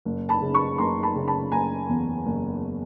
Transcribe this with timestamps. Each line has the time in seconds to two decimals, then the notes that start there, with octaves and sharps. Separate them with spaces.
0.05 F#1
0.29 A5 B5
0.42 C#3
0.54 B5 C#6
0.78 F#1 A#5 C6
1.03 A5 B5
1.15 C#3
1.28 A5 B5
1.52 F#1 G#5 A#5
1.89 E2
2.26 F#1